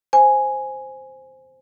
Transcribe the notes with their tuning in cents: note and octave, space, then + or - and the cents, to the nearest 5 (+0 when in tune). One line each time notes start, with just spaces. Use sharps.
C5 +0 G#5 +0